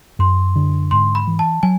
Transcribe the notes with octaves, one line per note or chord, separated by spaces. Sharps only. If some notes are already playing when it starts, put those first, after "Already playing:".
F#2 C6
D3
G#2 C6
B5
E3
A5
F#3 G#5